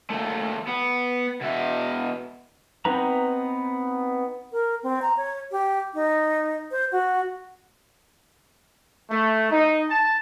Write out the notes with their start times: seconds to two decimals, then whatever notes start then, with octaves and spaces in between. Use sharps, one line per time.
0.10 D#2 A3
0.67 B3
1.41 B2 E5
2.85 B3 C4 D#4 B4 A#5
4.52 A#4
4.83 C4
5.02 A#5
5.17 C#5
5.51 G4
5.94 D#4
6.71 C5
6.92 F#4
9.09 A3
9.50 D#4
9.88 A5